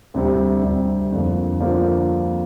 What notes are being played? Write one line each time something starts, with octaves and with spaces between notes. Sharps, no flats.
D2 C3 G3
D2 C3 G3
F2 D3 F3 A#3
D3 F3 A#3